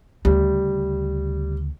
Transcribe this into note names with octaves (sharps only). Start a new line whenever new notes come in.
D2 C#3 G3